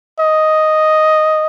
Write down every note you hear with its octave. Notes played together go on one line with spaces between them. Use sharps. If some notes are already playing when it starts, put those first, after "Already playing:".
D#5